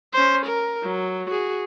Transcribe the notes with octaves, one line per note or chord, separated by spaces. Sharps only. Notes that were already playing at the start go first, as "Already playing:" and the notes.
C#4 C5
A#4
F#3
F#4 G#4